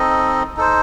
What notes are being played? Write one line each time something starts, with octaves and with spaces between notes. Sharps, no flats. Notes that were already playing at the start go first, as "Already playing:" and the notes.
Already playing: C4 D#4 A4 D#5
D#4 A4 C5